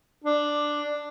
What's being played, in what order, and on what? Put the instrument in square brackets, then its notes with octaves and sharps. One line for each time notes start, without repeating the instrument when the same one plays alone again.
[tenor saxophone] D4